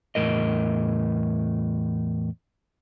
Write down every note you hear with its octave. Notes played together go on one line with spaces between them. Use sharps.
E2 A2 A#4 D#5